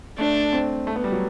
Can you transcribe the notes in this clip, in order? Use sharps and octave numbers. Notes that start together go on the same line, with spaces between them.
A3 D4
C4
A3
B3
G3
F#3